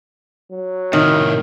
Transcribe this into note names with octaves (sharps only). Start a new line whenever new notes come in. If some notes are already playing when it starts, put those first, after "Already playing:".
F#3
A2 C3 D#3